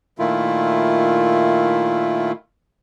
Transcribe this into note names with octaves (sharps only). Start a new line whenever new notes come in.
A#2 D#3 A3 E4 F4